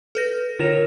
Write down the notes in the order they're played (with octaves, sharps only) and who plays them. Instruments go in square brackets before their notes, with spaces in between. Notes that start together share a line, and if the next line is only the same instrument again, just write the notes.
[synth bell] A4 B4 A#6
[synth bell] D3 E7 [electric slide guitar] F4 A#4 C#5